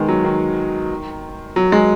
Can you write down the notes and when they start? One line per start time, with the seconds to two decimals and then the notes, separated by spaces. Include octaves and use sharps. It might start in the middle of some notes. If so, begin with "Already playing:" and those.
Already playing: D#3 G#3 B3
0.08 F#3
0.24 D#3
1.56 F#3
1.72 G#3